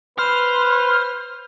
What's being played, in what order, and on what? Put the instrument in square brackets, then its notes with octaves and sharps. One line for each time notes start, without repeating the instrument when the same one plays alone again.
[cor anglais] B4 [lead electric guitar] C5 [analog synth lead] F6